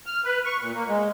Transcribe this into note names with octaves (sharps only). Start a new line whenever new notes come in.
F6
B4
C#6
A#2
A#3
G#3